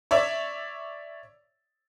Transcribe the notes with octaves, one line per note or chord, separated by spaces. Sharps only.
C#5 D5 E5